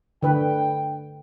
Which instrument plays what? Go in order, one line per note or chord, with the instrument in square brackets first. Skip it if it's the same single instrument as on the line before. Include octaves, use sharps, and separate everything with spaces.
[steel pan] D3 B4 [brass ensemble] G5